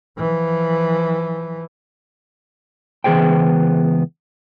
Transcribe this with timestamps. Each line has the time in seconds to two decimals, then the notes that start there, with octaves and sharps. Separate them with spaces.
0.17 E3 F3
3.04 C#2 E3 B3 G#4 C5 G5